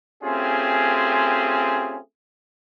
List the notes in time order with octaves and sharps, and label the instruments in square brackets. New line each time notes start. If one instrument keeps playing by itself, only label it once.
[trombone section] A3 C4 C#4 F4 G4 G#4